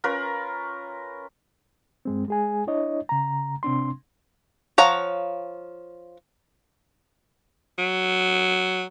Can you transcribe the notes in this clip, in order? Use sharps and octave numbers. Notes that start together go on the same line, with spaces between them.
C#4 F4 A#4 B4
G2 G#3 C4
G#3 G#4 G#5
D4 E4 C#5 D#5
C#3 A#5
C3 C4 D4 C6
F3 C#5 F5 F#5 A#5
F#3